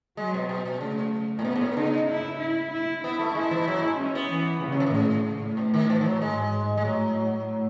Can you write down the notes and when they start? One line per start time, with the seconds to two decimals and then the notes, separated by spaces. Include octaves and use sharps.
0.17 F#3 G#3
0.34 B2
0.49 B2
0.65 B2
0.81 C#3 A3
1.39 A2
1.45 B2 B3
1.56 G#2
1.61 A2
1.76 C#3 D#4
2.08 E4
2.40 E4
2.72 E4
3.04 B3 E4
3.19 A3
3.35 G#3 E4
3.51 E3
3.68 F#3
3.83 G#3
3.99 C#4
4.15 B3
4.31 E3
4.63 C#3
4.72 F#3
4.80 E3
4.86 D#3
4.94 A2 C#3
5.57 B2
5.74 D#3
5.90 E3
6.01 E3
6.06 F#3
6.21 G#2 G#3
6.77 G#3
6.85 A2 F#3